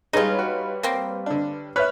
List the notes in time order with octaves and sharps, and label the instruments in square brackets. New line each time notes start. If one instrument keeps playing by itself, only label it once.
[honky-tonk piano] G3 B4 C#5 [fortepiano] G#3 G#4 [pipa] D#4 F4
[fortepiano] F#4
[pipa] A#3 C4
[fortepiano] D3 D4
[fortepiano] B4 C#5 [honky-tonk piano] E5 F6 F#6